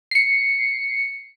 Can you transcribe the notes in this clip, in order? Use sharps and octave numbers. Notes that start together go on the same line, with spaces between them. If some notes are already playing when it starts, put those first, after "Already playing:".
C7 C#7